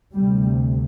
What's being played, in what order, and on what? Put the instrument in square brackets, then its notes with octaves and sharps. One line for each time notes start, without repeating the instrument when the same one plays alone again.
[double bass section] D2 C3 G3